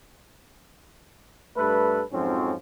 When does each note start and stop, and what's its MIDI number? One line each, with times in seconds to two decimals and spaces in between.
1.57 2.02 43
1.57 2.02 57
1.57 2.02 69
1.57 2.02 71
2.12 2.52 41
2.12 2.52 44
2.12 2.52 53
2.12 2.52 54
2.12 2.52 60
2.12 2.52 61